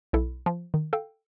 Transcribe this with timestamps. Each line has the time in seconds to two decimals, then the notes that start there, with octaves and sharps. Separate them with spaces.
0.13 B1 E4 A4
0.46 F3
0.74 D#3
0.93 A4 F5 G5